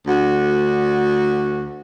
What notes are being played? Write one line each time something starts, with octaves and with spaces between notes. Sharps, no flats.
D2 F#4